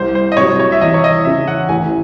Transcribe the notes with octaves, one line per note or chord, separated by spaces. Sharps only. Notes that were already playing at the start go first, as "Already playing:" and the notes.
Already playing: C2 C5
C5
D#5
C3 F#3 C#5
C#5
E5
E2 D#5
C#5
D#5
C#3 E3 E5
F#5
A1 G#5